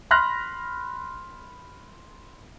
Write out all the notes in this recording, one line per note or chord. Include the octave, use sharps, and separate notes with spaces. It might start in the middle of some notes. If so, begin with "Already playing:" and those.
B5 C6 F6 F#6 A#6